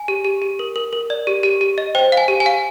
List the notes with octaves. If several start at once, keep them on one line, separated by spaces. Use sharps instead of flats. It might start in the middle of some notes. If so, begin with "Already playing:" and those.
Already playing: G#5
G4
G4
G4
A#4
A#4
A#4
D5
G4
G4
G4
D#5
C5 G5
F5
G#5
G4
G#5
F5